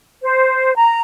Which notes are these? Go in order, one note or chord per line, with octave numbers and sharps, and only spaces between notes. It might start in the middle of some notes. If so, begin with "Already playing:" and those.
C5
A#5